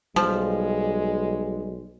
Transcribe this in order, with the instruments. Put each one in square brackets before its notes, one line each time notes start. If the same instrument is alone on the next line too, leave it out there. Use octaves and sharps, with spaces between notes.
[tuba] B1 [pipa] F3 [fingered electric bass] G3 [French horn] G#3